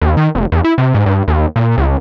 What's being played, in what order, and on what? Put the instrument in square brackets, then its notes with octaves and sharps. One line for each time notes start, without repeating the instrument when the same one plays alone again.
[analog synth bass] D#2
D#3
F1
E2
E4
C3
G#2
G2
D#2
A#2
C#2